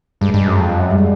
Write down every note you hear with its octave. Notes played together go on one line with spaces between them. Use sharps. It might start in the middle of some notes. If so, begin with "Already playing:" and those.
G2 G#3
G2
F#2
F2
F#2
G3
G#3